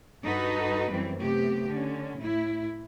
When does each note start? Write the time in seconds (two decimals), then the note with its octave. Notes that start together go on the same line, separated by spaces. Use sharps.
0.24 G2 D#4 F#4 A4 B4
0.90 F#2 E3 G3 C4
1.20 C3 A3 B3 G4
1.69 D3 C#4
2.18 A2 E4